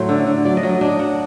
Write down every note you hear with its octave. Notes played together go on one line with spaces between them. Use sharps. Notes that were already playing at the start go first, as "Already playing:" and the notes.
Already playing: A2 F#3 A3 C5
D3
D3
F#3 D5
D#5
F#3
D#5
D4 D#5
D4 F#5